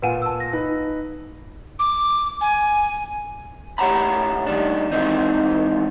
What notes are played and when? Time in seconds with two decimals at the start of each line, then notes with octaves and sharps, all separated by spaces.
0.02 A#2 F4 B4 F#5 G#5 D#7
0.22 A5 E6
0.40 A#6
0.53 D#4 B4
1.79 D6
2.41 G#5
3.78 A2 G4 C#5 F#5 A#5 B5
4.46 D#3 G3 D4
4.91 G#2 D#3 E3 C4 D#4